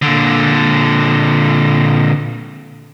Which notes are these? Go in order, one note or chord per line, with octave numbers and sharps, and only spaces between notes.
A#2 D3